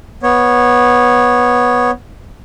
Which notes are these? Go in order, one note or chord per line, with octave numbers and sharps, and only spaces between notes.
B3 C#5